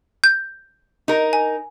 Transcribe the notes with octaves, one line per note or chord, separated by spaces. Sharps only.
G6
D#4 A#4
G#5